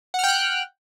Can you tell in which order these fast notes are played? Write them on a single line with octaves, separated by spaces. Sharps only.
F#5 F6 G5 F#6